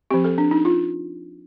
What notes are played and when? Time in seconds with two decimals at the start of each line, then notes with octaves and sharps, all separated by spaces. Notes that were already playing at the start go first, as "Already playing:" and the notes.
0.11 F3 C4 G4
0.24 A4
0.38 D4
0.51 D#4
0.65 F4